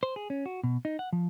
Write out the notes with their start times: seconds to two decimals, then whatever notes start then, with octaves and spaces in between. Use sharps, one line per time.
0.03 C5
0.16 G#4
0.30 C#4
0.46 F#4
0.64 B2
0.85 D#4
0.99 F#5
1.13 F3